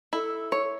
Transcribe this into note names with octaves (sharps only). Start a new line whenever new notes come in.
E4 A4
C#5